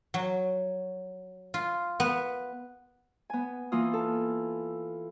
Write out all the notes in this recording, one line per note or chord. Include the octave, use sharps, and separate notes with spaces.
F#3
F4
B3
B3 G#5
E3 A#3 F4 D#6
A4